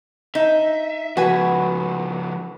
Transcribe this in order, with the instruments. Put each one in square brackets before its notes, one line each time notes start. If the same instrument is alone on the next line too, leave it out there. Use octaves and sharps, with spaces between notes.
[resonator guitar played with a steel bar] D#4 [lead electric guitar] E5
[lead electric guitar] C#3 F3 [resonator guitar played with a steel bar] F#4 [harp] B4 G#5